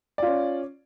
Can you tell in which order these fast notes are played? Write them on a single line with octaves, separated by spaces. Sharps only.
D5 F4 C#4